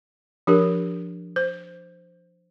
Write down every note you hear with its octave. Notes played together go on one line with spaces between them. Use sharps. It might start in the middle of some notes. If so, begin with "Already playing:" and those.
F3 D4 G4 A#4
C5